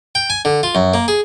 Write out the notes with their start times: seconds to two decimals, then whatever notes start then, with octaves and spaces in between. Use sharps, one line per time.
0.15 G5
0.30 G#5
0.45 D3
0.63 F4
0.75 F#2
0.94 A#3
1.08 G#4